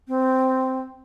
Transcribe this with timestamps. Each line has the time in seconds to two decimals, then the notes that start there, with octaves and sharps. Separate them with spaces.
0.08 C4